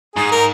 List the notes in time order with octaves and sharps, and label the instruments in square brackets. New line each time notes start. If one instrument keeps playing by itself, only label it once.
[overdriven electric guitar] G#2 [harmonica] G#4
[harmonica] A#4